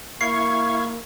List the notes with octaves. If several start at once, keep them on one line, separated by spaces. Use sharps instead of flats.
A#3 E4 F5 C#6 G#6 C7